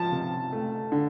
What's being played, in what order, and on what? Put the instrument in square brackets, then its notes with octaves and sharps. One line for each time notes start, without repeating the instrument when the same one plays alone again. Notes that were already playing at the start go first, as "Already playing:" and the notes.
Already playing: [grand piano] F3 [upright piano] A5
[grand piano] C3
A3
D3